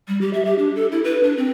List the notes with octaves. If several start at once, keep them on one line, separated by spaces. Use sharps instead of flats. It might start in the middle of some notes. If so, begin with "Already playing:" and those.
G3
G4
E5
G4
D4
A4
E4
B4
D4
C4